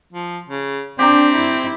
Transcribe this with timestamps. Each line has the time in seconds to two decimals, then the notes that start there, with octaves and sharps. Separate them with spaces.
0.13 F3
0.49 C#3
0.99 C4 D4 G4 A#5
1.34 E4